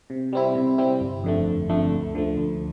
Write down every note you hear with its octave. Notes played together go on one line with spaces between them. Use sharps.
C3
G3 C4 E4
C3
G3 C4 E4
G1
F2 D3 A3
G1
F2 D3 A3
D2
D3 F3 A3
D2